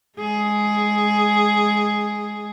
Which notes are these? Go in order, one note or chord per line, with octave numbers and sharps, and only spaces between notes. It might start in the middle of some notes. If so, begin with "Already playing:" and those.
G#3 G#4